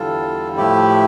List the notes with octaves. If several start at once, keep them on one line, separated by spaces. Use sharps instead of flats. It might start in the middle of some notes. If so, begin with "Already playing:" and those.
Already playing: E2 D3 G3 F4 A4
A2 F3 A3 E4 G4